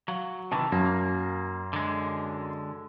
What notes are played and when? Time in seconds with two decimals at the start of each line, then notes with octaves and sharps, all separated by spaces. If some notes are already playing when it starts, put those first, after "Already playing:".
0.08 F#3 F5
0.52 C3 D#3 E3 A5
0.72 F#2 A#3
1.73 D3 G#3